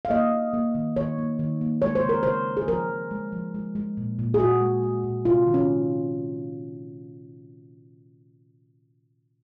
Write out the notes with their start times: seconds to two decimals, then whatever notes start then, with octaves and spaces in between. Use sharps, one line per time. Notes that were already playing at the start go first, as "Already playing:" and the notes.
0.05 F5
0.10 A#3 D#5
0.32 A#3
0.54 A#3
0.75 D#3
0.96 D#3 C#5
1.18 A#3
1.39 D#3
1.61 A#3
1.82 G#3 C#5
1.95 C5
2.04 C#3
2.09 A#4
2.23 C#3 C5
2.47 G#3
2.57 G#4
2.68 F3 A#4
2.90 F3
3.11 G#3
3.32 F3
3.55 G#3
3.75 G#3
3.97 A#2
4.19 A#2
4.34 G#4
4.40 A#2 F#4
4.61 G#3
4.83 G#3
5.04 A#2
5.25 C3 F4
5.47 D#3
5.54 C#4